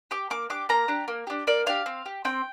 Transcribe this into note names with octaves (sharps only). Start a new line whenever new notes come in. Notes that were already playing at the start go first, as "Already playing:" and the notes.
G4 D6
A#3 D6
D4 G4 D6
A#3 A#5
D4 G4
A#3
D4 G4
A#3 D5
D4 G4 F5
C4
G4
C4 G5